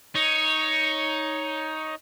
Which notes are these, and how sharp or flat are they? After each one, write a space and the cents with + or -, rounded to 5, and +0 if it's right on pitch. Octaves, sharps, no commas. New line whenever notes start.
D#4 +10 C#5 +0